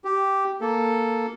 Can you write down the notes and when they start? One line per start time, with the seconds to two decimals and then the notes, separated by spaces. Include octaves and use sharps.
0.04 G4
0.61 A#3 A4